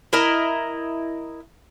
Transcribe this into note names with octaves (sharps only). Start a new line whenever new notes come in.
E4 A#4 D#5